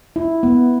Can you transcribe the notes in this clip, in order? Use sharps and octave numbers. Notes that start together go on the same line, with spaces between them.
E4
B3